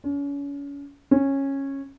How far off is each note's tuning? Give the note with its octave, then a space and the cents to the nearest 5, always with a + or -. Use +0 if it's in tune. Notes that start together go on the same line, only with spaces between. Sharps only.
C#4 +35
C#4 -15